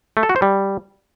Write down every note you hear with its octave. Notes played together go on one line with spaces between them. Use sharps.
A3
A4
F#4
C5
G3